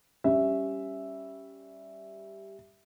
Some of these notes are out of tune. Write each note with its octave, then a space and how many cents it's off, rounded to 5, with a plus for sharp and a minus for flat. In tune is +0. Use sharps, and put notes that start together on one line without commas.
G3 +0 C#4 +0 E5 +0